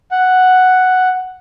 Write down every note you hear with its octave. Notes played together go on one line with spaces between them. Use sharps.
F#5